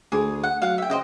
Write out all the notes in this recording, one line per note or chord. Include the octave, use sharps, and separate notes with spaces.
D2 G#4 D6
F#5
F#3 F5 F#5
E5 G5
C#3 C5 D#5 G5